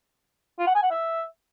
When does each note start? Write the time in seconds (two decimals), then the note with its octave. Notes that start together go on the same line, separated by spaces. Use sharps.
0.59 F4
0.67 F#5
0.75 G#5
0.83 F#5
0.91 E5